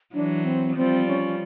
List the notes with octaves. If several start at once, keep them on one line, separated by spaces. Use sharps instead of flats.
E3 F#3 D4
C4
F3 G3 C4
C#4